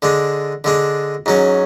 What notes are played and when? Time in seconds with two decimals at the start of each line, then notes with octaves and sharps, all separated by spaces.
0.02 D3 G#3 D4
0.64 D3 G#3 D4
1.26 G#2 F#3 C#4